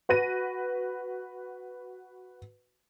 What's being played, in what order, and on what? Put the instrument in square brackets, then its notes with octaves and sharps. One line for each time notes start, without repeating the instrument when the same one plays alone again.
[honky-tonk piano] F#4 B4 A#6 D#7